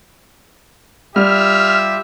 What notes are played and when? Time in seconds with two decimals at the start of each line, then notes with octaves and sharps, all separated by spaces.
1.16 G3 F4 G4 E5 F6